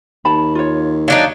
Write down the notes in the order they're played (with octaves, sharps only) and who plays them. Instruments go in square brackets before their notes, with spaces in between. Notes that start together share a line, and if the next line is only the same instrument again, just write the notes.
[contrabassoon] D#2 [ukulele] A5 B5
[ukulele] F4 C#5
[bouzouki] F#3 D4 D#4 [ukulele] F5